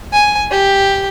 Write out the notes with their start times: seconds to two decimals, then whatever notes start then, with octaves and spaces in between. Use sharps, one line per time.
0.13 G#5
0.51 G4